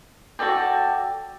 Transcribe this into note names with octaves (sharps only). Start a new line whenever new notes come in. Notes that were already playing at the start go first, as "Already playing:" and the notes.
F#4 A4 D5 G5